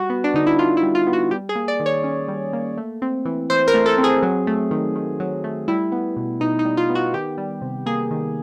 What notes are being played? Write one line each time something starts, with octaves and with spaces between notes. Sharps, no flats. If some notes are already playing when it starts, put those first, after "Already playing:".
Already playing: G3 F#4
B3
D4
D3 D#4
E4
D4 F4
E4
G3
F4
B3
F#4
G3 G4
G#4
A#3
D5
D#3
C#5
C#4
G3
A#3
A3
C4
E3
E3 C5
A#4
A3
A4
C4
G#4
F#3
A3
D#3
D#3
F#3
A3
G3 E4
B3
B2
B2 D#4
D#4
G3
F4
B3
F#4
D#3 G4
G3
C3
A#3 G#4
D#3